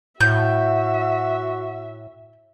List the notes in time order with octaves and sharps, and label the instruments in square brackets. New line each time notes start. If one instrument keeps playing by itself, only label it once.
[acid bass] A2 [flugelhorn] F#4 [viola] E5 [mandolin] G6